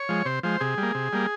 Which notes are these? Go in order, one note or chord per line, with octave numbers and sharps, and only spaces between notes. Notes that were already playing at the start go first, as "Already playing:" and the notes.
Already playing: C#5
F3 G#3
C3 C5
F3 G#3 C5
C3 G#4
G3
A#3
C3
G3 A#3